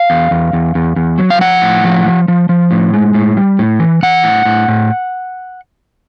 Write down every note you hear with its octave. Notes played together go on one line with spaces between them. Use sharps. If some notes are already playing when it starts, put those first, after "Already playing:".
Already playing: F5
E2
E2
E2
E2
E2
F#3
F5
F3 F#5
A2
F3
F3
F3
F3
A2
G#3
A2
G3
A2
E3
E3 F#5
A2
A2
A2